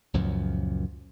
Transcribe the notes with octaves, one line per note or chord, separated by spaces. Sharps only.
C#2 F#2 A#2 F3